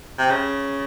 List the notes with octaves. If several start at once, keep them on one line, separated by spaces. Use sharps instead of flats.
C3
C#3